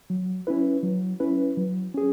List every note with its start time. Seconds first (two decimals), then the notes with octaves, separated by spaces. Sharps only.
0.10 F#3
0.47 C#4 E4 B4
0.83 F#3
1.20 C#4 E4 B4
1.57 F#3
1.94 C#4 G#4